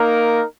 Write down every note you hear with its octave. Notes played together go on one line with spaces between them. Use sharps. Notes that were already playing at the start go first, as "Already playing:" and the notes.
Already playing: A#3 D#4 A#4